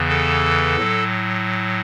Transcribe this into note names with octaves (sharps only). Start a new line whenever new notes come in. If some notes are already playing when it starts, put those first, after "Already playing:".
Already playing: E2 C#3 E3
A4
A2 F#3